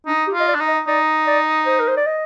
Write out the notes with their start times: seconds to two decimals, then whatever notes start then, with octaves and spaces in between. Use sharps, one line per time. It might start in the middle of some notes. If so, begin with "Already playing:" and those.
0.07 D4 D#4
0.27 G4
0.34 F4
0.40 D#5
0.48 D5
0.55 D4
0.60 D#4
0.68 D#5
0.87 D#4 D5
1.27 D5
1.66 C5
1.80 A#4
1.88 C5
1.97 D5
2.06 D#5